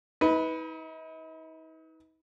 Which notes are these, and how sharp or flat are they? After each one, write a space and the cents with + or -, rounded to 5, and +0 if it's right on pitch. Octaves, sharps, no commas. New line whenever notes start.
D#4 +45 B4 +0